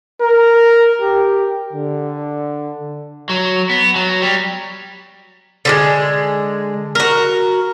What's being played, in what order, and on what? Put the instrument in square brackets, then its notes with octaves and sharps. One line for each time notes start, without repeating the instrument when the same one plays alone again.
[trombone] A#4
G4
D3
[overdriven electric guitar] F#3
B3
F#3
G3
[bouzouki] D3 G3 G#3
F#4 A#4